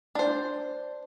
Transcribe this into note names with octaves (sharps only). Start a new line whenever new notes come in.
D4 C5